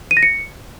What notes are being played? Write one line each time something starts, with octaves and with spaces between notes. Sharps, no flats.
D#7
A#6
C#7